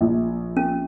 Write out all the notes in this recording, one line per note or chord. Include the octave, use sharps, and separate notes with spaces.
A#1
C#4